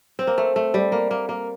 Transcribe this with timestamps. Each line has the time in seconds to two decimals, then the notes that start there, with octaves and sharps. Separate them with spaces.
0.19 C4
0.27 A#3
0.38 A3
0.56 A3
0.74 G3
0.92 A#3
1.11 A#3
1.29 A#3